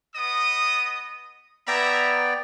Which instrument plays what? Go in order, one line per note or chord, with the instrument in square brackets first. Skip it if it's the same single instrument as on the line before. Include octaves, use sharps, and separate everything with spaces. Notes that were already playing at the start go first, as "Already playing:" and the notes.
[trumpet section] B3 D#5 D#6
[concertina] B3 D5 G5 [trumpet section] E4 E5 A#5